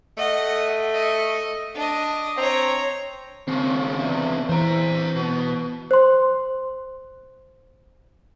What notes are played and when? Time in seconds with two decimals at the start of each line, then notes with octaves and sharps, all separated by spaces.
0.17 A3 D#5 F#5
0.93 D#5
1.74 D4 D#5
2.38 C4 C#5 A#5
3.48 D#2 C#3 C4
3.99 E2 C3
4.49 E3 C5 A#5
5.15 B2
5.91 C5 C6